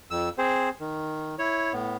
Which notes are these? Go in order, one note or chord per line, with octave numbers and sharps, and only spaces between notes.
F2 E6
C4 G#4 C5
D#3
E4 C#5
A2 B3